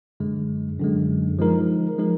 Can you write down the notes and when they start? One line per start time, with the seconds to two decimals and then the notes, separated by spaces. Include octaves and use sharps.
0.20 F#2 D3 G#3
0.80 F#2 D3 G#3
1.39 F3 G#3 D#4 A#4
1.99 F3 G#3 D#4 A#4